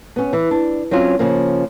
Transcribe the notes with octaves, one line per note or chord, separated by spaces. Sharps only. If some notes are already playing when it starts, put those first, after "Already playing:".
B3 C#4
E3
D4
F#3 C4 C#4 F4
C#3 F3 A#3